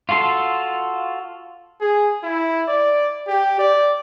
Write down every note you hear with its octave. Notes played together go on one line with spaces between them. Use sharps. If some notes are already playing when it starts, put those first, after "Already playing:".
F4 F#4 A4 C6
G#4
E4
D5
G4
D5